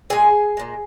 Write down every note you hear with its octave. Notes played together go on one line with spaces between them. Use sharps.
A#2 G#3 G#4 G#5
A#2 G#3